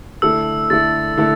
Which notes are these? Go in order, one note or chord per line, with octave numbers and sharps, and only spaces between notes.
D3 A3 E4 A4 E6
D3 A3 E4 A4 A6
D3 A3 E4 A4